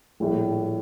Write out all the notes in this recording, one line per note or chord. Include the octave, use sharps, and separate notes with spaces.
A#1 A2 G3